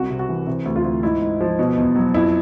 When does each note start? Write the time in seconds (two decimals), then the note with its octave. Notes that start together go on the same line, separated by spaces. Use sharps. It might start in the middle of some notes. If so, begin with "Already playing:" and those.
Already playing: C2 F#4
0.10 C3
0.19 F#4
0.29 E3
0.47 C3
0.65 D2
0.76 F4
0.84 D2
1.03 G#2 E4
1.22 G#2
1.41 F3
1.59 B2
1.77 E2
1.96 F#3
2.14 F2 E4